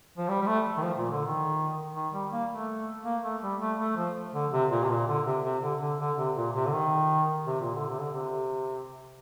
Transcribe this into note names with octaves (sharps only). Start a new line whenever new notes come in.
F3
G3
G3
A3
D#3
F3
A#2
D3
D#3
D#3
G3
A#3
A3
A#3
A3
G3
A3
A3
F3
D3
C3
A#2
C3
A#2
D3
C3
C3
D3
D3
D3
C3
A#2
C3
D3
D#3
C3
A#2
D3
C3
D3
C3